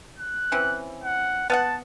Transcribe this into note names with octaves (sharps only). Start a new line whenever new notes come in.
F#6
E3 C4 C#4
F#5
B3 F5 F#5 A5